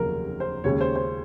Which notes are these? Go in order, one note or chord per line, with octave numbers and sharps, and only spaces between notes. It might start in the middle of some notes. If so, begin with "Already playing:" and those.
Already playing: F1 D#2 C#3 F#3 A#4
C5
D#2 C#3 G#3 C#4 C#5
C5
C5